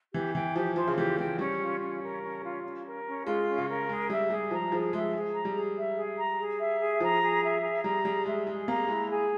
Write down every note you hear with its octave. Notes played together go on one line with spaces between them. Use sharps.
E3 G4
E3 G5
F3 G4
F3 C5
C#3
E3 G4
E3 G5
G3 C#4
F4
C#4
A#4
C#4
F4
C#4
A#4
C#4
G#3 F4
C#4
C#3
A#4
G#3 G#4
G3 E5
G3 G#4
F3 A#5
F3 G#4
G#3 E5
G#3 G#4
A#5
G3
G#4
E5
G#4
A#5
G#4
E5
G#4
F3 A#5
G#4
E5
G#4
G3 A#5
G3 G#4
G#3 E5
G#3 G#4
A#3 A#5
G#3 E4
G#4